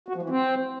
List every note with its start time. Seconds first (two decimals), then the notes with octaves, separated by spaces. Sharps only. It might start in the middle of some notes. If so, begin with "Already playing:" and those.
0.08 F#4
0.15 F3
0.23 E3
0.30 C4